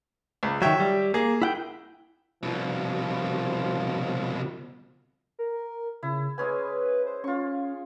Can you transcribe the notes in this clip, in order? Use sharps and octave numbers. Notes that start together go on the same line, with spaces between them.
C#2
D#3 F#3 C#5 E5 G5
G3
A#3 G#4
E4 F#5 G5
C2 B2 F3
A#4
C#3 E4
G#3 C#4 B4 G#5
C5
C#4 F4 C#6